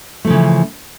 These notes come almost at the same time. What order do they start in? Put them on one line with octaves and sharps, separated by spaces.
A3 F3 C#3 E3